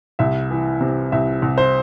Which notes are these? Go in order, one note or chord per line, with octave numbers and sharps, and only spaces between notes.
C2 E5
E3
C3
C2 E5
C2
C5